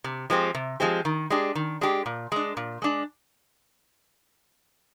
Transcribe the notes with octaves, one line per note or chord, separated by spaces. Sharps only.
C3
F3 G#3 C4 G4
C3
F3 G#3 C4 G4
D#3
G#3 D4 G4
D#3
G#3 D4 G4
A#2
G#3 D4
A#2
G#3 D4